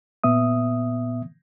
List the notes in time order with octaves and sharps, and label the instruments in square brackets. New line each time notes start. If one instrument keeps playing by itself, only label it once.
[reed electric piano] A#2 B3 E5 D#6